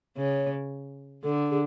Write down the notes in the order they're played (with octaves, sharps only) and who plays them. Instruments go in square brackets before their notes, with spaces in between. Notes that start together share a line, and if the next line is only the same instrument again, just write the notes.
[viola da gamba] C#3 [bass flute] C#5
[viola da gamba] D3 [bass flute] A4
[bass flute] G#4